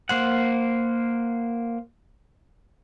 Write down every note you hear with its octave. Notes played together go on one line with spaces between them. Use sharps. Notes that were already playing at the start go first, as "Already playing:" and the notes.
A#3 C5 F#5